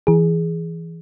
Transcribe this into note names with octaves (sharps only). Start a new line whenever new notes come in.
E3 G#4